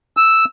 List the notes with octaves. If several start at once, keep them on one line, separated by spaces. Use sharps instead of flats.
E6